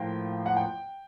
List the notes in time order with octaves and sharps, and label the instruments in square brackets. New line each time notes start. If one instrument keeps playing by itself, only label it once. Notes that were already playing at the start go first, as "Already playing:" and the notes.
Already playing: [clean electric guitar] A2 F3 A#3 [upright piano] G5
[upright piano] F#5
G5